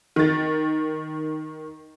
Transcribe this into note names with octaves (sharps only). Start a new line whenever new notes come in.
D#3 A6